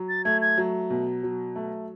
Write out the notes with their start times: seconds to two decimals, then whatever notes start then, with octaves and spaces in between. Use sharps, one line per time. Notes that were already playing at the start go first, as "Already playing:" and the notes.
Already playing: F#3
0.09 A6
0.25 A3 G#6
0.42 G#6
0.58 F#3
0.90 B2
1.23 F#3
1.56 A3